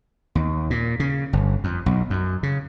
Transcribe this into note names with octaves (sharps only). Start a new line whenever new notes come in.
D#2
A#2
C#3
G1
F2
B1
F#2
C#3